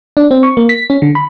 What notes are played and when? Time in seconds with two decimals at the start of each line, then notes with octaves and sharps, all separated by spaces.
0.17 D4
0.31 C4
0.43 C#6
0.57 A#3
0.69 B6
0.90 C#4
1.02 D3
1.15 B5